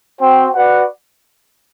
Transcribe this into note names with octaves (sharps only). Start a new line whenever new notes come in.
C4 F#4 C5 G5
F#4 B4 D5 F#5